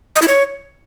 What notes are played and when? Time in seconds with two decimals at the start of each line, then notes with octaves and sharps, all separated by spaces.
0.16 D#5
0.22 E4
0.28 C#5